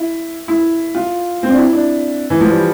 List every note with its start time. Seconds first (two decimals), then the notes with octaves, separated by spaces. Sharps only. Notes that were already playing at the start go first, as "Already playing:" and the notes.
Already playing: E4
0.48 E4
0.95 F4
1.43 C4
1.50 D4
1.57 E4
1.73 D4
2.30 E3
2.41 F3
2.51 G3